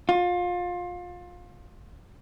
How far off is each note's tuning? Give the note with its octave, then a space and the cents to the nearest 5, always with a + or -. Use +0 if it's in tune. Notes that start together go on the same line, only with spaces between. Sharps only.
F4 +25